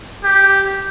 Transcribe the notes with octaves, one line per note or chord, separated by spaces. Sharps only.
G4